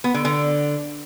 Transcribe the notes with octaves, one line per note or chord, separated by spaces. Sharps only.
B3
D3
D3